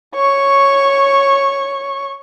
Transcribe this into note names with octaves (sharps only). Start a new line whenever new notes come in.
C#5 C#6